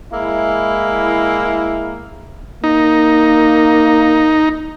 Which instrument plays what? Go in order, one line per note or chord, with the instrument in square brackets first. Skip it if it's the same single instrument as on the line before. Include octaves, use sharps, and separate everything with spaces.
[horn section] G#3 A#3 E4
[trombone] A#3 [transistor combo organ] D#4